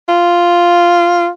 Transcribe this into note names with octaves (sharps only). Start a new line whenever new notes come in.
F4